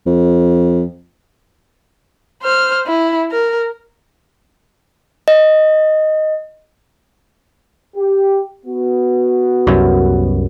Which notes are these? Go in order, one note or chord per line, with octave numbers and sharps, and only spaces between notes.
F2
C5 F6
E4
A#4
D#5
G4
B3 F#4
C2 F#2